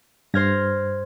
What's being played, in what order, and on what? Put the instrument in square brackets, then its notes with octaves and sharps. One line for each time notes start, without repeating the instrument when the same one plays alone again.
[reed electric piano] G2 G#6 [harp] C5 F6 A#6